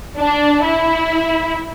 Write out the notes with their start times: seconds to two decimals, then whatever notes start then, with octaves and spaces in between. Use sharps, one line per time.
0.18 D4
0.63 E4